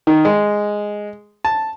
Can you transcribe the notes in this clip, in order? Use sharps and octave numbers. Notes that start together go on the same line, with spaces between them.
D#3
G#3
A5